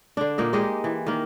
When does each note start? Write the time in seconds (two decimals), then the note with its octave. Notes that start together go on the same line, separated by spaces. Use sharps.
0.17 D3 D4
0.38 A#2 A#3 D#4
0.53 G#3 G4 D#5
0.84 E3
1.07 D#3 A#3